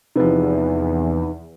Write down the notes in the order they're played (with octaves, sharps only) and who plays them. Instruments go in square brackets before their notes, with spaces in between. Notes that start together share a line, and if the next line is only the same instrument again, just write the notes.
[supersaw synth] E2 [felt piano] C3 F3 [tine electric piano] D#4 B4